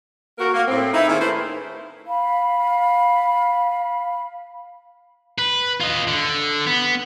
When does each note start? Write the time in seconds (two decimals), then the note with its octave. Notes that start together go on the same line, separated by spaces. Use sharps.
0.39 A#3 F#4 A#4
0.54 A#3
0.68 A2 C4
0.94 D#4 E4
1.08 D#3 A#3 C#4 E4 G#4 C5
1.20 A3 E4 B4 C5
2.07 F5 B5
5.38 B4
5.81 F4 D#5
6.08 D3
6.67 B3